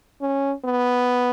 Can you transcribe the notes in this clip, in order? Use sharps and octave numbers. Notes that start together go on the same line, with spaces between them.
C#4
B3